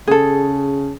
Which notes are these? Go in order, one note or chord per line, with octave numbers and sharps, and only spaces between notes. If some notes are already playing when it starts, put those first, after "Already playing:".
C#3 G#4 A4